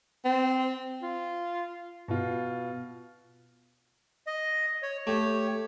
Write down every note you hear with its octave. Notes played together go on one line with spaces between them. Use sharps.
C4
F4
B2 F4
D#5
C#5
A3 G4 C#5